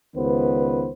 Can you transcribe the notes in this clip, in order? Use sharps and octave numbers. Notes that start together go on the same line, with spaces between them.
C#2 D#3 B3 B4 C5